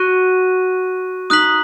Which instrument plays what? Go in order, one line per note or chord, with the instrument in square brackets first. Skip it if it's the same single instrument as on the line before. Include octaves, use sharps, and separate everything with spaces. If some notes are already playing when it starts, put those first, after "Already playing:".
Already playing: [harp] F#4 [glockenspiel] C#6 F#6 A#6 D#7
[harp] D#4 [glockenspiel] D#6 F#6 B6 F#7